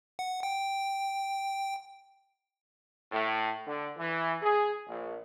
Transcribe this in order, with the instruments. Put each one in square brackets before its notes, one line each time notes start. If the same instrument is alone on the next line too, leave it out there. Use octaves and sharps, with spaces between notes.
[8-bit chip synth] F#5
G5
[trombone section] A2
D3
E3
G#4
A#1